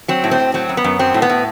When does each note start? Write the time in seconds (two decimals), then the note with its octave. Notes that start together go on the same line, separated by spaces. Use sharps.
0.08 F#3 C4
0.24 A2
0.31 C4
0.40 A2
0.54 F#3 C4
0.69 F#2
0.77 B3
0.84 F#2
0.99 F#3 C4
1.14 A2
1.22 B3
1.30 A2